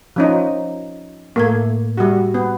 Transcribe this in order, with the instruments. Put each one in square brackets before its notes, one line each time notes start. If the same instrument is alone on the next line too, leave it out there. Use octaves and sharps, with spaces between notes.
[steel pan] F3 C#4 D#4
[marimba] A2 G#6 [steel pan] A3 A#3
[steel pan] G3 F#4
B3